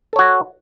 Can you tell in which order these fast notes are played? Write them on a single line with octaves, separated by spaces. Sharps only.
A4 C#5 F#4